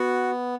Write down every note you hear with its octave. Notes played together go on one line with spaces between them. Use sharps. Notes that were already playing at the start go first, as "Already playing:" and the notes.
Already playing: B3 F#4